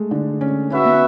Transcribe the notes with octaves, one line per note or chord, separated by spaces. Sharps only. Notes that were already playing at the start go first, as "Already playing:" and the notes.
Already playing: G#3 A3
D3
C#4
C#4 F#4 B4 E5
B3